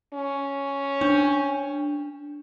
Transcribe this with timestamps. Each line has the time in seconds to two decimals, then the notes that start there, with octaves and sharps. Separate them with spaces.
0.14 C#4
1.01 D4